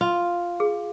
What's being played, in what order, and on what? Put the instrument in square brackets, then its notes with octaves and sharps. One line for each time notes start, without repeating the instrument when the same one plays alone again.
[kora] F4
[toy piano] G#4